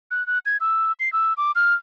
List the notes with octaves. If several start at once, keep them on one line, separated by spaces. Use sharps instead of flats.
F#6
F#6
G#6
E6
C7
E6
D6
F6